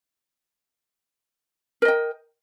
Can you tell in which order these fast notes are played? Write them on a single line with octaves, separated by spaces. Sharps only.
A#4 D#5 G5